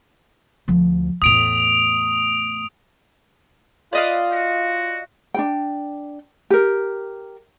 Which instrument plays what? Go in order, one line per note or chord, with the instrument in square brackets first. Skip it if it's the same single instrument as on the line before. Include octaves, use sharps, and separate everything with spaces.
[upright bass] D2 F3
[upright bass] E2 A2 [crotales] D#6 D7 F7
[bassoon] F4 [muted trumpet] B4 [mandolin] D5 D#5 F5
[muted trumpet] F#4
[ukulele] D4 F4 G5
G4 A#4